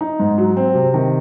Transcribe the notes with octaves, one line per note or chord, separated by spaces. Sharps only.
D#4
G#2
F#3
C4
C3
D#3